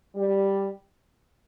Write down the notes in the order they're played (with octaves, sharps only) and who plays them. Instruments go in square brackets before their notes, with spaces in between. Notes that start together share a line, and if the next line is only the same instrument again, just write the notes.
[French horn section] G3